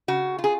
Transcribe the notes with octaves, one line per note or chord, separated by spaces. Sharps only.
C#3 F#4
F4
G#4